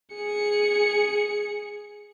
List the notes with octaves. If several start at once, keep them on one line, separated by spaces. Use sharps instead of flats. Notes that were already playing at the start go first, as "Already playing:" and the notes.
G#4 C#7